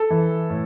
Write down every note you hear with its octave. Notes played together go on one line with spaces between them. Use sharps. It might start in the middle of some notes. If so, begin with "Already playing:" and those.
Already playing: A4
E3
A2